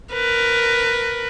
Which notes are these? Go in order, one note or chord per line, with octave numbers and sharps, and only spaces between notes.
A#4 B4